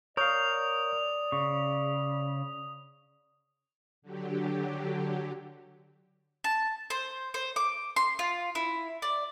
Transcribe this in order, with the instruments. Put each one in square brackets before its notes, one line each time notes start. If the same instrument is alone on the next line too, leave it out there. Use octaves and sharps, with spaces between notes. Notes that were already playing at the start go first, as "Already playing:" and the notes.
[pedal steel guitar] A#4 F5 [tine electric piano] C#5 C#6 G6 [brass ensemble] D5 [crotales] D#6 F7
[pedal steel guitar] C#3 [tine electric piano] C#6
[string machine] D3 F#3 G4
[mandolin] A5
C5
C5
D6
C6
F4
E4
D5